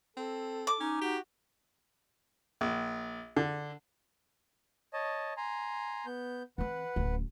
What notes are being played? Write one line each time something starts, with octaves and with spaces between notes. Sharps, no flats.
C4 A4
D6
C#4 D#4
F#4 G4
A#1
D3
C#5 D#5 A5
G#5 A#5 C6
B3 G6
E3 C4 B4 F#5
D1 C#4